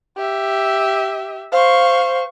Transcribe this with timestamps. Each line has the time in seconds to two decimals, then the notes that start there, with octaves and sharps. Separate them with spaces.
0.17 G4 E5
1.52 C5 F5 C#6